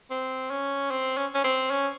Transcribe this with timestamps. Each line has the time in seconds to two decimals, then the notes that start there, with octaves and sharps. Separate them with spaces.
0.10 C4
0.50 C#4
0.91 C4
1.17 C#4
1.34 C#4
1.44 C4
1.71 C#4